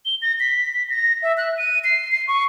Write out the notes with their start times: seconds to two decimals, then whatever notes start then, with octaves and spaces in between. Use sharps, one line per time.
0.05 G7
0.22 A#6
0.40 B6
0.90 A#6
1.23 E5
1.37 F#6
1.58 D#7
1.84 C7
2.12 C7
2.28 C#6